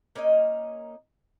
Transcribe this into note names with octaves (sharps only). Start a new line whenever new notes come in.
A#3 C#4 D#4 D#5